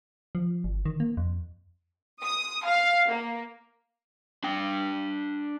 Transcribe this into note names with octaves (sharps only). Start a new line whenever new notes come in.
F3
G1
D#3
A#3
F2
D#6
F5
A#3
D4 G5